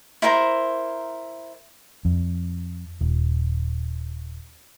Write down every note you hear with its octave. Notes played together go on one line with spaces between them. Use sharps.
E4 A#4 C5 A#5
F2
D#1